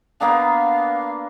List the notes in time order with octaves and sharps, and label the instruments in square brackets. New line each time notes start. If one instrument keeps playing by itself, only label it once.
[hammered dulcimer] A#3 B3 D4 [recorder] F5